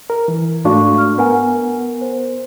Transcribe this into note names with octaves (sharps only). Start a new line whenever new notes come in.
A#4
E3
G#2 A3 D4 F#4 F5 C#6
F6
B3 A#4 F#5 G#5
C5